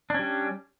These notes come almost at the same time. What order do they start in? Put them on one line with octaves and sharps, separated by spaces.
D4 C#4 G3